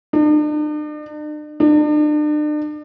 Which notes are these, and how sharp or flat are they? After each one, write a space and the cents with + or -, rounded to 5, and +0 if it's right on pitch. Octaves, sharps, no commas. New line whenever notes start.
D4 +45
D4 +40